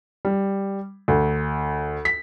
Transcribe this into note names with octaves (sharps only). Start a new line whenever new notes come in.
G3
D2
B6